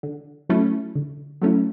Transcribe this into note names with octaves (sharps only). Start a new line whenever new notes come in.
D3
F#3 A3 C#4 E4
D3
F#3 A3 C#4 E4